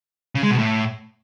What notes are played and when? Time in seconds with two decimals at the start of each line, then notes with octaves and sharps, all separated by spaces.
0.35 C#3
0.43 G#3
0.51 B2
0.59 A2